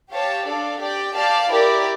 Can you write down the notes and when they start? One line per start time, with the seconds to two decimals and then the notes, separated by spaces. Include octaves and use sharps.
0.10 G4 C#5 F5 A5
0.46 D4 A4 D5 F5
0.81 G4 D5 G5
1.15 G4 D5 F5 A5
1.51 E4 G4 A#4 D5